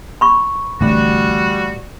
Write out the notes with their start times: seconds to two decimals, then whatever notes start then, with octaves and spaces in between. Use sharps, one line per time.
0.21 B5 C#6
0.81 A1 D2 G3 F#4